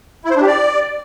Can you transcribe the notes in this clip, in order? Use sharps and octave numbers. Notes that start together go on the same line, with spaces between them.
E4
C5
D4
G4
D5